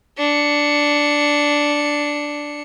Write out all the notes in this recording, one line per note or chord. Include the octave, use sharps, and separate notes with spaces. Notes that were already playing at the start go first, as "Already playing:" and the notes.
D4 C#7